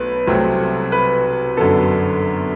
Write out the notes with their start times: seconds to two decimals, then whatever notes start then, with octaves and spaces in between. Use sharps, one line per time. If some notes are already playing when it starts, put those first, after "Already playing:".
Already playing: B1 A3 B4
0.27 C2 C3 F#3 A3 C4
0.92 B4
1.57 G1 F#2 D3 F#3 B3 A4